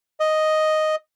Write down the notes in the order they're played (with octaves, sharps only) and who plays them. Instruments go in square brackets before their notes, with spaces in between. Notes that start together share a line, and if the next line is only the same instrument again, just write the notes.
[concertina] D#5